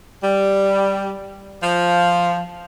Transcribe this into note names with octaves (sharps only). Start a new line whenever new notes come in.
G3
F3